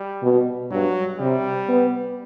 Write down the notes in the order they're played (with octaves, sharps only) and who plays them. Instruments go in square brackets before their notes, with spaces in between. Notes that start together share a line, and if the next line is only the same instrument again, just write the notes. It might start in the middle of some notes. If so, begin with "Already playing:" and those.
Already playing: [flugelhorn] G3
[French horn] B2
[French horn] G2 [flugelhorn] F#3
[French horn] C3 [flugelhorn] G3
[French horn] B3